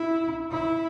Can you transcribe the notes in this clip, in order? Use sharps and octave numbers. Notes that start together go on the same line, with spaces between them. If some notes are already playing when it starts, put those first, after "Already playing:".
Already playing: E4
E4